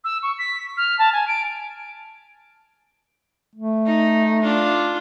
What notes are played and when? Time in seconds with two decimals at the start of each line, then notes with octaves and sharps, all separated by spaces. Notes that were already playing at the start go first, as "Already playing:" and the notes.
0.04 E6
0.22 C#6
0.38 B6
0.76 F6
0.98 A5
1.12 G#5
1.27 D7
3.56 A3
3.86 D#4
4.42 D4 F4